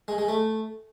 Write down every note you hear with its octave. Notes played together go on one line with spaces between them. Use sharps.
G#3
G#3
A3